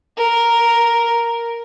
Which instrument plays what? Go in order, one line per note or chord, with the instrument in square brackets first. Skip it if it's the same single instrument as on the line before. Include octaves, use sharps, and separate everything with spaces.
[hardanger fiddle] A#4